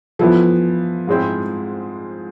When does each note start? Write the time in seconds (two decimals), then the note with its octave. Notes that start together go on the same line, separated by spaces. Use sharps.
0.19 E3 F3 B3 E4 A4
1.07 G#2 G#3 C4 E4